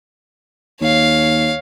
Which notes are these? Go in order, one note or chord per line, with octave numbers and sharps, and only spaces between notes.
D#2 C#5 F5